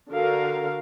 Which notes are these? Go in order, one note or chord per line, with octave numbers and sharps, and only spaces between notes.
D3 F#4 A#4 F5